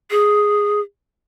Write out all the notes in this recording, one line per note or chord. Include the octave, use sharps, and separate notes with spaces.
G#4